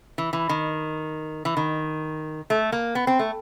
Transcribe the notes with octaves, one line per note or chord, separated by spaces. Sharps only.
E3
E3
D#3
E3
D#3
A3
A#3
B3
C4
A3